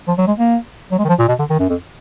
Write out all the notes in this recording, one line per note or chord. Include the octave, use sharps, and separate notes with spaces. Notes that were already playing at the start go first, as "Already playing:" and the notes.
F3
F#3
G#3
A#3
F#3
G#3
D#3
F3
A#2
B2
D3
D#3
F#2
F2